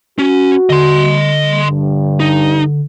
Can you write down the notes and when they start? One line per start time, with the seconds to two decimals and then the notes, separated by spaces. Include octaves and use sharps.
0.19 C#4 F#4
0.70 D3 D#5 C6
1.67 G2
2.20 D#4